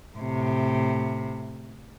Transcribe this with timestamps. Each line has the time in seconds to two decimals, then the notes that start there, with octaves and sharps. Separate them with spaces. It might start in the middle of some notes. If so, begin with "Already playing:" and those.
0.17 A2 C3